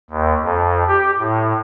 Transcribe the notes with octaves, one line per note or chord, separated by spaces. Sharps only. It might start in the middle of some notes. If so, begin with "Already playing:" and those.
D#2
F2
G4
A2